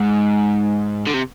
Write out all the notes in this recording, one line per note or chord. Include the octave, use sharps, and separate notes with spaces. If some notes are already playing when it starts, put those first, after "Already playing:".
Already playing: G#2
D3
C3